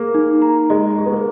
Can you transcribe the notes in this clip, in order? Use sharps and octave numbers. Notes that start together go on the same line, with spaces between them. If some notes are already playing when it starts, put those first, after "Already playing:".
Already playing: A#3 G#4
D#4
A#5
G#3 D#5
G#4
B3
A#3